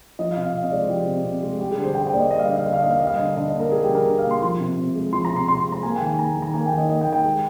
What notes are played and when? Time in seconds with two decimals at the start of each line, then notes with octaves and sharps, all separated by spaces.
0.19 F3 D#5
0.31 F5
0.36 C3
0.42 F5
0.54 C3 F5
0.63 D#5
0.71 G#3 D5
0.81 C5
0.89 F3 G4
1.07 C3
1.24 C3
1.43 G#3
1.60 G3 G4
1.71 G#4
1.77 D3
1.83 C5
1.95 D3 G5
2.07 G5
2.13 A#3 D5
2.19 D#5
2.31 G3 D#5
2.39 F5
2.48 D3 D#5
2.56 F5
2.65 D3 D#5
2.73 F5
2.82 A#3 D#5
2.91 F5
2.99 G3 D#5
3.07 F5
3.16 D3 D#5
3.36 D3 D#5
3.48 D#5
3.55 A#3 A#4
3.72 G3 G#4
3.84 G4
3.89 D3
3.95 A#4
4.07 D3
4.19 F5
4.25 A#3
4.31 C6
4.42 F3 C6
4.60 C3
4.78 C3
4.95 G#3
5.12 F3 C6
5.25 A#5
5.31 C3
5.36 C6
5.48 C3 C6
5.60 C6
5.66 G#3
5.72 A#5
5.83 A#3 G#5
5.96 G5
6.02 D#3
6.07 G#5
6.19 A#3 A#5
6.36 D#3
6.42 A#5
6.54 A#3 G#5
6.66 G5
6.72 D#3
6.78 D#5
6.89 A#3 D#5
7.01 G5
7.07 D#3
7.13 G5
7.25 G#3